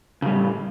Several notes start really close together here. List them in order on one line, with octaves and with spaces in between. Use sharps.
C#3 G3 A2